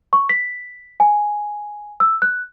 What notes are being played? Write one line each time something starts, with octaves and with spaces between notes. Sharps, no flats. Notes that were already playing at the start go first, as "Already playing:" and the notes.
C#6
B6
G#5
E6
F#6